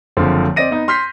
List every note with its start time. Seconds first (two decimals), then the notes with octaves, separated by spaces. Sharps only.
0.17 F#1 D3 F3 C4
0.56 C4 D5 D#5 A#6 D#7
0.71 B3 D#4
0.88 C6 F6 G6 B6 C7